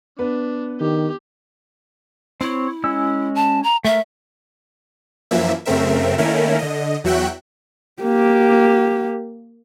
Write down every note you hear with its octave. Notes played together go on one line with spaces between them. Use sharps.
B3 D4 B4
D#3 G4
C4 E4 C#5
G#3 C#4 E6
A5
A#5
A3 A#4 E5
F#2 E3 F3 A#3 E5
F#2 C#3 A3 C4 A#4 E5
D#3 A3 A#3 C#4 E4 A#4
D3 D#5
E2 F#3 F#4 E5 G5 F#6
A#3 G4